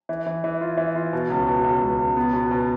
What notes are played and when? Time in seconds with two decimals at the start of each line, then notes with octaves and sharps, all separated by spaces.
0.09 E3
0.27 E3
0.44 E3
0.61 F4
0.77 E3
0.96 F4
1.13 B2
1.30 C#2
1.47 B2
1.64 C#2
1.82 C#2
1.99 C#2
2.17 B3
2.33 B2
2.51 B2